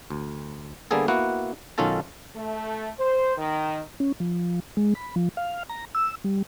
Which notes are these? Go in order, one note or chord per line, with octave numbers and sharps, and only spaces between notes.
D2
D3 G3 A#3 B3 G#4 A4
A#3 B3 E4 F#4 F#5
B1 D#3 C#4 F4 A4 A5
A3
C5
D#3
C#4
F3
G#3
B5
F3
F5
A#5
E6
G3